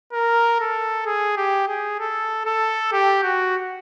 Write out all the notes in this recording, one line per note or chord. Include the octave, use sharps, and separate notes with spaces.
A#4
A4
G#4
G4
G#4
A4
A4
G4
F#4